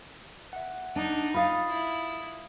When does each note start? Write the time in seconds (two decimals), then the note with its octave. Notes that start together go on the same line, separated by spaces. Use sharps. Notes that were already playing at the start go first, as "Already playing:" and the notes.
0.53 E5 F#5
0.96 D4 D#4
1.34 F4 F5 B5 D#6 A6
1.69 E4